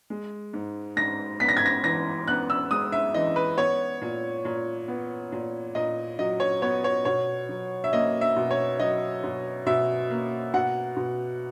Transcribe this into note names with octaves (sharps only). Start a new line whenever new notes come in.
G#3
G#2
G#2 A#6
B3 B6
A#6
G#6
A#6
E3 A#6
B3 F#6
E6
G#3 D#6
E5
E3 D#5
B4
B3 C#5
A#2
A#2
B3
A#2
A#2 D#5
F#3 D#5
C#5
B3 C#5
C#5
B2 C#5
F#3
E5
A#3 D#5
E5
B2
C#5
F#3 D#5
B2
B2 E5
A#3
B2 F#5
B2